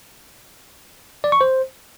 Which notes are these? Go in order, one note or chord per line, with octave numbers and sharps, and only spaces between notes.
D5
C#6
C5